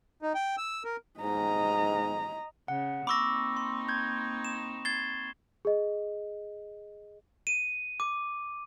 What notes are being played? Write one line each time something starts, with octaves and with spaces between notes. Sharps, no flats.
D#4
G5
E6
A#4
G#2 D#5 A#5
C#3 F#5
A#3 C4 D#4 B5 C#6 D6 E6 A#6
C6
G6 G#6
E7
G#6 A6 C7 G7
G#4 D#5
D#7
D6